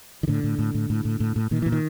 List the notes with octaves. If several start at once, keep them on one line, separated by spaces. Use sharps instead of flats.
D#3
A2 D3
A2
A2
A2
A2
A2
A2
A2
A#2 D#3
A#2 E3
D#3